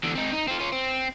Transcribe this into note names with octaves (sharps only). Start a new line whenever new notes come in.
E2 D3
C4 D#4
D#4
C4 F4
C#4 F4
C4